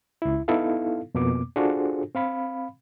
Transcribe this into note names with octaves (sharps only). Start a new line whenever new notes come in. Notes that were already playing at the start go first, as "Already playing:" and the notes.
C#2 E4
B3 D#4 E4 A4 F5
F2 B2 A#3 B3 D6
D4 F4 F#4 G#4 A4 C5
C4 F5 B5